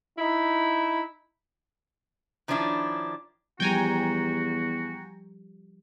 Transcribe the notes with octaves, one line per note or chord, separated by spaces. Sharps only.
D#4 E4
D#3 F3 C#4 D4 E4
E2 F3 G3 F#4 G5 G#5 A#5